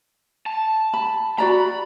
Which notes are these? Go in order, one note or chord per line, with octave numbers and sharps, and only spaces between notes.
A5
B5
F#4 D5 A#5 B5